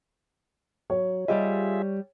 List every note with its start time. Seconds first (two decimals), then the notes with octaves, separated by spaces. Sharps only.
0.90 F#3 C#5
1.28 G3 F4 G4 G#4 D#5 E5